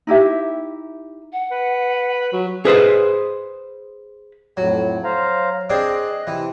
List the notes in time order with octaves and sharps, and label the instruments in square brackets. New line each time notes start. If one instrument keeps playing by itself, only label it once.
[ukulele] D#4 E4 G4 E5
[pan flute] F#5
[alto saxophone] B4
F#3
[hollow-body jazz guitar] G#4 B4 C5 D#5
[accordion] F2 A2 [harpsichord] F#3
[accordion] C5 F5 A#5
[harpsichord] C4 D4 G#4 [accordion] D#5 F#6
[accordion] C3 C4 [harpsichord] E3